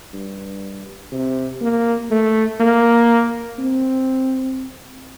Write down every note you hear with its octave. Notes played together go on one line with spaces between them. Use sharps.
G2
C3
A#3
A3
A#3
C4